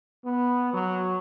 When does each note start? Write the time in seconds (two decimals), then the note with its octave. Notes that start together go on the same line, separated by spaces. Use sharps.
0.25 B3
0.73 F#3